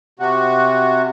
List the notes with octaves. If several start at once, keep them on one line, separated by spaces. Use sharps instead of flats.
C3 F#4